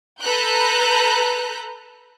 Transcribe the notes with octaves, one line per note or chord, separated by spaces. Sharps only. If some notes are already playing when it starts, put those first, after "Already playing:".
A4 B4 A#5 F#6 G6